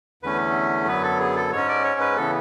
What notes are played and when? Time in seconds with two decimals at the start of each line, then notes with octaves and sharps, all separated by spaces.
0.23 E2 D3 A3 C#4 B4
0.87 F#2 D3 F#3 B3 B4
1.03 A4
1.20 G#4
1.36 A4
1.52 G#2 G#3 C#4 C#5
1.68 D5
1.84 C#5
2.00 B4
2.17 C#3 E3 B3 A4